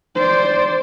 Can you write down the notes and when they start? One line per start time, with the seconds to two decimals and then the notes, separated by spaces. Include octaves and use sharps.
0.15 C5 D5